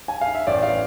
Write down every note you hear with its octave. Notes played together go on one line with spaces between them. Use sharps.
G#5
F5
E5
A1 D5
F5